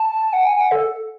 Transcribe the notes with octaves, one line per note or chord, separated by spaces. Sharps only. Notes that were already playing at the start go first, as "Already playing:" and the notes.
Already playing: A5
F#5
G#5
F#5
A4